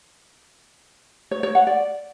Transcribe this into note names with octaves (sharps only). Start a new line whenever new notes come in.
C#5
C#5
F#5
D5